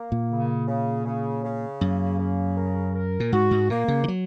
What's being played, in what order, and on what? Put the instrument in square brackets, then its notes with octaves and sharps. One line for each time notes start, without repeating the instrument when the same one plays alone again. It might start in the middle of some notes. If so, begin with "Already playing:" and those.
Already playing: [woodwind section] A#3
[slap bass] A#2
[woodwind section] C#3
C#3
C#3
C#3
[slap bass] F#2 [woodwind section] A#3
[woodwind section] C#3
A#4
A#4
[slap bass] A#2
[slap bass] G#2 [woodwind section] F#4
[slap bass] G#2
[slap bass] A#2 [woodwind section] A#3
[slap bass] C#3
D#3
F#3